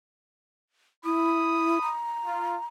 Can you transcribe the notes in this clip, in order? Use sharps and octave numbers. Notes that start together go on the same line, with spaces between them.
E4 B5 D#6
A#5
F4